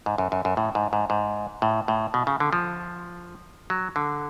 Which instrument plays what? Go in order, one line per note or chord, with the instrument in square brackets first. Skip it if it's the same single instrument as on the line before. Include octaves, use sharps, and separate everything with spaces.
[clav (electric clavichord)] G#2
F#2
F#2
F#2
A2
G#2
G#2
G#2
A2
A2
B2
C#3
D3
F3
F#3
D3